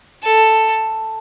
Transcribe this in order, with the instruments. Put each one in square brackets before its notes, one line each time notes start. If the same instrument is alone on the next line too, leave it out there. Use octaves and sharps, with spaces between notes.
[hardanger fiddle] A4